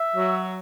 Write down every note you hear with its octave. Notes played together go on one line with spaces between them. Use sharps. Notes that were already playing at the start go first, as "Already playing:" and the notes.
Already playing: E5
F#3